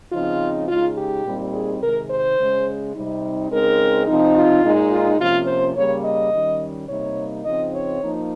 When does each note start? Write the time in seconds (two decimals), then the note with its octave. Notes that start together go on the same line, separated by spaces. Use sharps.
0.12 C#3 F3 C4 D#4 F4
0.68 C#3 G#3 D#4 F4
0.97 G4
1.25 A#2 G3 C4 D#4
1.53 G#4
1.81 C3 D#3 G#3 A#4
2.09 C5
2.38 C#3 G#3 C#4
2.94 C3 G3 C4 D#4
3.50 C#3 G#3 C4 D#4 A#4
4.07 C3 F3 C4 D#4
4.35 F4
4.63 A#2 G#3 D#4
4.91 F4
5.19 C3 F3 A#3 C#4 F4
5.47 C5
5.75 C#3 G3 A#3 C#5
6.04 D#5
6.32 D#3 G3 C#4
6.88 C3 G3 A#3 D#4 C#5
7.45 C#3 F3 C4 D#4 D#5
7.73 C#5
8.01 F3 A#3 D#4